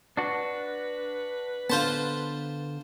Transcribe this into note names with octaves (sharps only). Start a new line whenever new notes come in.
D4 F#4 B4
D3 B3 F4 C5 A5